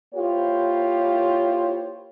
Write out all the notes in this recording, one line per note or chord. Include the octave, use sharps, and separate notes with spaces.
A#3 E4 F4 G4 C5 C#5